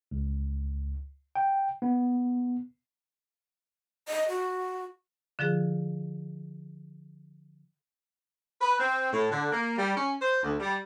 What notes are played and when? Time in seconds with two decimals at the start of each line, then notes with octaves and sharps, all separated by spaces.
0.11 C#2
1.36 G5
1.82 B3
4.08 D#5
4.28 F#4
5.39 D3 F3 F4 G#4
8.60 B4
8.79 C4
9.12 A2
9.30 D3
9.52 A#3
9.77 G3
9.95 C#4
10.21 C5
10.42 D2
10.59 G3